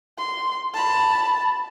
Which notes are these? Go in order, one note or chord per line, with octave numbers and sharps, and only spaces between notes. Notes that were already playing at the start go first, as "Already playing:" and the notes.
C6
A5 B5